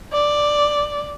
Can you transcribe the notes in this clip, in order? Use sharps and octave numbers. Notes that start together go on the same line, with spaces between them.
D5